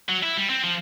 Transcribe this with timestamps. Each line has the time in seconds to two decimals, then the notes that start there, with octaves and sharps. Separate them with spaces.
0.09 F#3
0.23 E4
0.37 G3
0.50 C4
0.64 F3